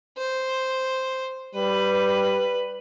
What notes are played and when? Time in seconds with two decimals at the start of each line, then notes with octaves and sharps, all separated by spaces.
0.18 C5
1.55 G3 B4